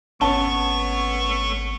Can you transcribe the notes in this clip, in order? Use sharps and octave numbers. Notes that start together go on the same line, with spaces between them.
G#1 A3 B3 C#4 C#5 A5 G7